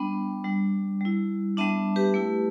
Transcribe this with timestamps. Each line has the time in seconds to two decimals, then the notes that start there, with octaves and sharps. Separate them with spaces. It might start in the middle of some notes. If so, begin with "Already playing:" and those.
Already playing: G3 B3 D4 G5 B5
0.44 G3 D4
1.01 G3 E4
1.57 G3 B3 D4 E5 A5
1.96 G4 B4
2.14 A3 E4